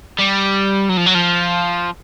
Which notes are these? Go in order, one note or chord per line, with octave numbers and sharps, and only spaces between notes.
G3
F#3
F3
F#3
F3